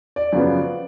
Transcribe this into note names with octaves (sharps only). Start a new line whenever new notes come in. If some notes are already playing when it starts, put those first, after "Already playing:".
D5
F#2 C#3 F3 B3